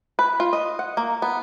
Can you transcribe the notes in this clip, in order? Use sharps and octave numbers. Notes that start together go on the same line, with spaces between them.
B4
F4
D#5
F#5
A#3
B3